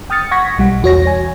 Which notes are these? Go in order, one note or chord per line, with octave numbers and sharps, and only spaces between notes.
G5 D#6 F6 A6 C#7
F#5 C#6 G#6 A#6 B6
B1 G3 F#5
E2 F#4 C#5 A#6
C#5 G#5